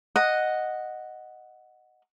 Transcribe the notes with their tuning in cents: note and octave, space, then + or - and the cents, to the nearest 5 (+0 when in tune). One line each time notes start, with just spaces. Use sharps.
D#5 -5 F#5 +0